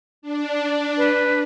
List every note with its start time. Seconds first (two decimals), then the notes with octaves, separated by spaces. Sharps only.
0.22 D4
0.97 B4